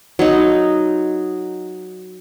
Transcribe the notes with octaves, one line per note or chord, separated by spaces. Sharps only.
F#3 D#4